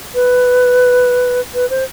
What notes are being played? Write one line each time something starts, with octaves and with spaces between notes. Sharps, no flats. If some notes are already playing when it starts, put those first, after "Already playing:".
B4
B4
C5